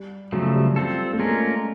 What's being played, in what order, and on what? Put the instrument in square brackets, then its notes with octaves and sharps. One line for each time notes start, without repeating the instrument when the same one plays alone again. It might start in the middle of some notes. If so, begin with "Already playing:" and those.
Already playing: [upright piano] G3
[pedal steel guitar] C#3 F3 A3 [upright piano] F#3
[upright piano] G3
[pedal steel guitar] C4 F4 A4
[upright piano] A3
[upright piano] G#3 [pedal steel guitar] A#3 C#4 F4 A#4